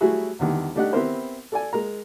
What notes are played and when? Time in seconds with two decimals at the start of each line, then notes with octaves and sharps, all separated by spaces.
0.01 F#3 G3 A3 E4 F#4 G#4
0.39 E2 D3 D#3 G3
0.75 G3 A3 D4 D#4 G4 F#5
0.93 B3 C4 E4 G4 A#4 C5
1.52 A4 D5 G#5
1.73 G#3 A#4 A#5